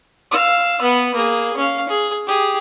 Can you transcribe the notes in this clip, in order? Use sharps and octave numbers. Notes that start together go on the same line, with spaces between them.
F5 E6
B3 B4
A#3 G#4
C#4 F5
G#4
G4 G#4